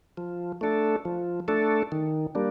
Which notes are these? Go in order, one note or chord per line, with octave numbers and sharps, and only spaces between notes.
F3
A3 D4 A4
F3
A3 D4 A4
D#3
G3 A#3 D4